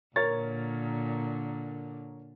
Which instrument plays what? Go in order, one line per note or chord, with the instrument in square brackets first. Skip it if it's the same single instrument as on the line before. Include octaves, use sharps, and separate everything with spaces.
[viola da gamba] A#2 D3 [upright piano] A#4 C#5 A6